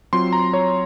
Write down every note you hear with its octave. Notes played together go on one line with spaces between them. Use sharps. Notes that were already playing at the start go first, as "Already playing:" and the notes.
F#3 C4 F4 C6
A#5
C#5